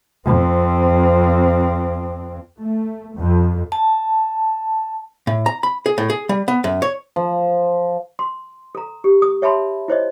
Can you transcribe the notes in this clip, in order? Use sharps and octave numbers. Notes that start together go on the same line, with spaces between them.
F2 C4
A3
F2
A5
A2
A#5
B5
G#4
A2
G#4
G3
B3
F#2
C#5
F3
C6
A4 A#5
G4
D#6
C#5 E5 A5 B5 C6
E4 C5 C#5 D#5